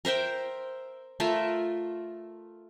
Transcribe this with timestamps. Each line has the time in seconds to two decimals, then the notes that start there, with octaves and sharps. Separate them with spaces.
0.05 A#4 C5 E5 G5
1.20 A3 F4 A#4 E5